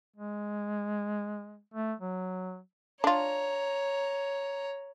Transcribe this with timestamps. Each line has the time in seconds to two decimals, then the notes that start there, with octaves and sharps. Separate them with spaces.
0.16 G#3
1.74 A3
2.00 F#3
3.04 D4 F4 C#5 A#5